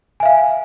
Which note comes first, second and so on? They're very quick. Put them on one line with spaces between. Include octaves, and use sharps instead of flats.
G#5 E5 F5